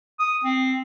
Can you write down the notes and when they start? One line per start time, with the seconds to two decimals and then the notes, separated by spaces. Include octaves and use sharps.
0.20 D#6
0.44 C4